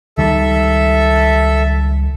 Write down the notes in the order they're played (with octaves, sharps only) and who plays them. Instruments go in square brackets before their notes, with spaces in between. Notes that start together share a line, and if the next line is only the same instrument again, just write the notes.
[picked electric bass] C#2 D#3 G3 [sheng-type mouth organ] A4 E5